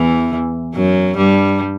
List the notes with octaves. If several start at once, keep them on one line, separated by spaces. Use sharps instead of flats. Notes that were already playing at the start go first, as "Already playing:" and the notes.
Already playing: E2 E3
F#2 F#3
G2 G3